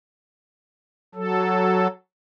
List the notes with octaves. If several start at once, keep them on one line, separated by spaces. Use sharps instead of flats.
F#3 A4